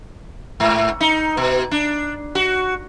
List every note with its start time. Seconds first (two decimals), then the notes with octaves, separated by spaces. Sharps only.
0.60 G#2
1.00 D#4
1.37 B2
1.71 D4
2.35 F#4